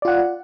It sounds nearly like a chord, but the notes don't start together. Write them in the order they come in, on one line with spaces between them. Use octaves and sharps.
D5 F4 F#5